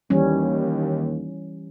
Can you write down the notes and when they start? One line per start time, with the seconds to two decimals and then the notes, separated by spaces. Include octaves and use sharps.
0.10 D#2 E3 G3 C#4